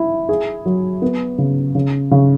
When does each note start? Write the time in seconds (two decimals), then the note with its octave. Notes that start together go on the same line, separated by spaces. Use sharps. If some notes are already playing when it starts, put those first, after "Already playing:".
Already playing: E4
0.29 G#4
0.66 F#3
1.02 B3
1.38 C#3
1.75 C#3
2.11 C#3